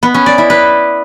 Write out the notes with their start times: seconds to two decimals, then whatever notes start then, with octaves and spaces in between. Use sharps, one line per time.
0.03 B3
0.14 C#4
0.26 D5
0.38 E4
0.50 B4